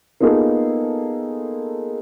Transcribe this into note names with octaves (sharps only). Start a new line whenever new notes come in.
A#3 B3 D#4 F4 G#4 A4